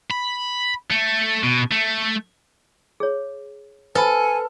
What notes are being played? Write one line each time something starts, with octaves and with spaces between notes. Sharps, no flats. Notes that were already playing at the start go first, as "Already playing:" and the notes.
B5
A3
B2
A3
G#4 C#5
A4 B4 C5 G#5 B5 F6